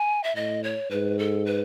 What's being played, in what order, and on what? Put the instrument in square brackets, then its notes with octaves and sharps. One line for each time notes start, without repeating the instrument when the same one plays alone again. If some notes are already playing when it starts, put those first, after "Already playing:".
Already playing: [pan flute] G#5
E5
[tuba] A2 [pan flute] D#5
[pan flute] C#5
[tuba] G#2 [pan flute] B4
[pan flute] A4
B4